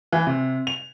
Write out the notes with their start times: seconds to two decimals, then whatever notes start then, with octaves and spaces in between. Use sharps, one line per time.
0.12 E3
0.27 C3
0.67 F7